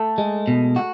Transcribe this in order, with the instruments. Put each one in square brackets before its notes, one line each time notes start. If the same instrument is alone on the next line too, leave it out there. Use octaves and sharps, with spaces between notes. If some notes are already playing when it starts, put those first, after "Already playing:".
Already playing: [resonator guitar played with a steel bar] A3
[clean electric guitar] G#3
B2
F#4